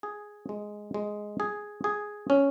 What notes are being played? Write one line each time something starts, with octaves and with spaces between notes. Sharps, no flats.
G#4
G#3
G#3
G#4
G#4
C#4